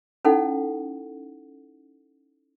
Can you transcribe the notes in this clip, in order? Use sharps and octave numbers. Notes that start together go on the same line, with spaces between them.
C#4 D#4 E4 A4 F#5